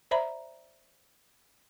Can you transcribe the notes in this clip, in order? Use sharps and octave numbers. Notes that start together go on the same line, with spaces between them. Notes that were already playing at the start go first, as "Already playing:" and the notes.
C5 D5 E5 A#5 B5